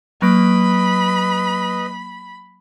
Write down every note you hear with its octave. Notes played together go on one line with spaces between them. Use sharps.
F#3 A#3 B4 D#5 B5 D7